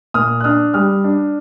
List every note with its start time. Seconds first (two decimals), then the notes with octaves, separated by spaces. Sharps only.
0.14 A#2 D#6 F6
0.40 F#6
0.44 D4 D#6 F6
0.74 G3 D#6 F6
1.04 D4